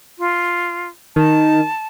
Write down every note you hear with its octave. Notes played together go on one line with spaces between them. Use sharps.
F4
D#3 A5